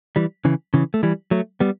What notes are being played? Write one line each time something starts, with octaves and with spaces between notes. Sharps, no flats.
E3 G3
C#3 E3
C#3 E3
A3
E3 G3
F#3 A3
G3 B3